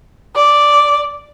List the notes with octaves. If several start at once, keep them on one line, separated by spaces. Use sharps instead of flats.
D5